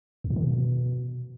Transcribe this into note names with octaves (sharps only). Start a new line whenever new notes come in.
E2
A2
D3
B2